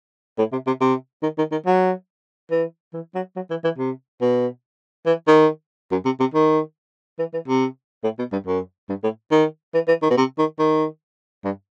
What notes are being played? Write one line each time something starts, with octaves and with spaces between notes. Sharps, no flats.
A2
C3
C3
C3
D#3
D#3
D#3
F#3
E3
E3
F#3
F#3
E3
E3
C3
B2
E3
D#3
F#2
C3
C3
D#3
E3
E3
C3
A2
B2
G2
F#2
G2
A2
D#3
E3
E3
D#3
B2
C3
D#3
D#3
G2